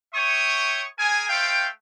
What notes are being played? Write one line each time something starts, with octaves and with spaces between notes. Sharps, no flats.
C#5 E5 G5 C#6 D#6
G#4 A#4 G#5
A3 C5 F5 G5